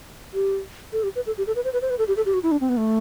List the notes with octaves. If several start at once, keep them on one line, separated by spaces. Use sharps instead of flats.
G4
A4
G4
B4
A4
G4
A4
B4
C5
B4
C5
B4
A4
G4
A4
G4
F#4
E4
D4
C4
B3
A3